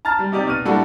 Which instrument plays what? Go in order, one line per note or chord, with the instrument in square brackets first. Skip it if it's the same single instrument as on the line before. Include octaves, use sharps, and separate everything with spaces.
[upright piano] A5 A#5 F6 A6
G3
C3 D#4 G4 D5
B2 F6 D#7
A2 G3 A#3 D4 F#4 A4